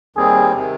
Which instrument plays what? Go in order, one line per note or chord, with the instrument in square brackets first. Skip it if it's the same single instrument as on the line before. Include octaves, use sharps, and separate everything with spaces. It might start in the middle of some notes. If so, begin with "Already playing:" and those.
[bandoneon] D#2 D#3 G3 C4 [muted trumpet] G#4
[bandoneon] C3 D#3